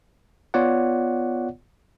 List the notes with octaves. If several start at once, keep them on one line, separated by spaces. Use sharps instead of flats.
B3 F4 C#5 D5 F#5